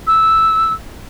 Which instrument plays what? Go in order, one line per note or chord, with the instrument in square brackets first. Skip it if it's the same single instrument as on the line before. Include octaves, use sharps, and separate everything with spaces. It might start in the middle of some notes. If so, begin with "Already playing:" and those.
[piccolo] E6